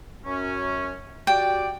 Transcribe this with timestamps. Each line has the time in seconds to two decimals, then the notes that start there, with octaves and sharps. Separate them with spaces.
0.25 F#2 C#4
1.27 F#4 G4 D5 G5